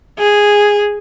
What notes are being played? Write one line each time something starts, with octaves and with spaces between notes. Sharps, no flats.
G#4